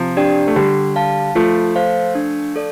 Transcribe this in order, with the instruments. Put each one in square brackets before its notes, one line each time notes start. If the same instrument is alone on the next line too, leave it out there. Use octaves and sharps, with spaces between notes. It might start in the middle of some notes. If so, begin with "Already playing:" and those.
Already playing: [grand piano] C3 F3
[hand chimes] D4 G4 D5 G5
[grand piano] A3
[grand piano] D3 G3 [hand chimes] G4
[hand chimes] F5 A5
[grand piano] F3 A3 [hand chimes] F4
[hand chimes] C5 F5
D4
A4 D5